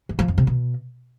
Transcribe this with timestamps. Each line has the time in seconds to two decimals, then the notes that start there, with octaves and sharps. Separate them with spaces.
0.09 E3
0.19 F3
0.28 F2
0.38 C3
0.47 B2